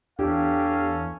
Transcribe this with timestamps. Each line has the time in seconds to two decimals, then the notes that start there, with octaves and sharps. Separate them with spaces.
0.19 E2 C#4 D4 G4 A4 F5